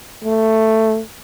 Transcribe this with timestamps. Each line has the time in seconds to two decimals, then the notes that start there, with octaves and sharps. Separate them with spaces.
0.24 A3